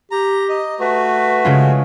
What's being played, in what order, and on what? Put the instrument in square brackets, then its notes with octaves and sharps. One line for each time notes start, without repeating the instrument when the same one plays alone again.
[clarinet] G4 [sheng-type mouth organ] A#5
[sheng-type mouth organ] D#5
[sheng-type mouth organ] A3 F#4 [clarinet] B4
[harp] C#3 G#3 F4